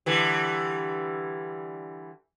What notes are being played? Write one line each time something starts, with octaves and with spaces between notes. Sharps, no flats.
D3 E3 G3